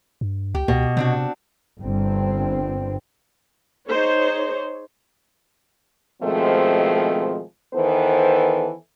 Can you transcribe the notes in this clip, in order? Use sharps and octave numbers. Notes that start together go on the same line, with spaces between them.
G2
C#2 G4
C#2 B2
C3 C4 D4 F#4
G1 G2 C4
D#4 G#4 C5 C#5
B2 D#3 F3 G#3 A3 C4
D#3 E3 B3 A4 C5